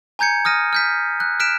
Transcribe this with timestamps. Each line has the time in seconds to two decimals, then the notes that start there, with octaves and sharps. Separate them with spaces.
0.19 G#5 A#5 G6 G#6 C#7
0.45 D#6 F6 A#6 D#7
0.73 F6 G6 B6
1.20 F#6
1.40 F6 F#6 B6 D7 E7